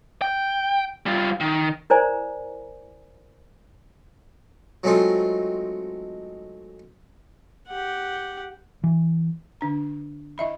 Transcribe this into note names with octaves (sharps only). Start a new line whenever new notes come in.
G5
G3 F4
D#3
E4 A#4 C5 D5 G#5 A#5
F#3 G#3 A3 C4 D#4 F4
G4 F#5
E3
D3 D4 A#5
E4 D#5 E5 B5